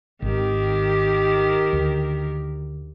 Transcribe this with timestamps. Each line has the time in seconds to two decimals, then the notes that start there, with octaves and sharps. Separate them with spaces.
0.22 G#1 D#3 G4 A#4
1.73 D2